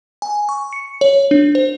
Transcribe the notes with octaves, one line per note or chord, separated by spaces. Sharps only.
G#5
C#6
C#7
C#5
D4
C5